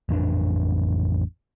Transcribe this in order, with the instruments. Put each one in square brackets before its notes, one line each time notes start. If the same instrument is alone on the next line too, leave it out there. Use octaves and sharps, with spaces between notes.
[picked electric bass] A1 F2 C4 D4